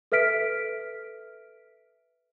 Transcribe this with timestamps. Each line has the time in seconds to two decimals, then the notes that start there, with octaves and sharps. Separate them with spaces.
0.12 A4 B4 E5 F6 B6 D7